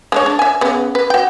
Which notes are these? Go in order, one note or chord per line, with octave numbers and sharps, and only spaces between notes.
G#3 D4 C#5
D4
E5 G#5
C#3 B3
B4
F#4 G5